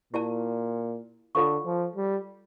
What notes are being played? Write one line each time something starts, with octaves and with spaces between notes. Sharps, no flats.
A#2 E4 G4 D5 A5
D3 F4 A4 C#5 F5 C#6
F3
G3